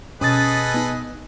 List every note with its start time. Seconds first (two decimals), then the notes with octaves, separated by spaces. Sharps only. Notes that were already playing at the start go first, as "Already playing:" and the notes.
0.21 B2 C#4 G#4 A4 B4 D#5 D#6 A6
0.74 B3 D#4